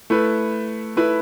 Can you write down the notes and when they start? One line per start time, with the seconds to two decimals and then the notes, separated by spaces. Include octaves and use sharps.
0.10 A3 E4 B4
0.97 A3 E4 B4